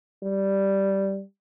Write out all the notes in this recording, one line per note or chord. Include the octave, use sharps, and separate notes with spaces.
G3